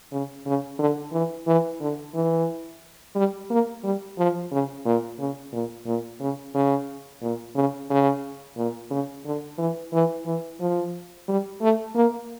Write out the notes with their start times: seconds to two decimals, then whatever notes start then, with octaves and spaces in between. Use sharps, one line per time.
0.12 C#3
0.46 C#3
0.79 D3
1.12 E3
1.47 E3
1.81 D3
2.14 E3
3.15 G3
3.50 A#3
3.83 G3
4.18 F3
4.52 C#3
4.85 A#2
5.19 C#3
5.52 A#2
5.86 A#2
6.21 C#3
6.55 C#3
7.22 A#2
7.55 C#3
7.90 C#3
8.57 A#2
8.91 C#3
9.25 D3
9.58 E3
9.93 E3
10.26 E3
10.60 F3
11.28 G3
11.62 A3
11.95 A#3